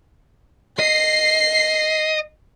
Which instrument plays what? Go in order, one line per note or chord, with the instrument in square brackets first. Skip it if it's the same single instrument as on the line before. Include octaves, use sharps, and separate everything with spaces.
[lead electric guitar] D#5 [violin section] C7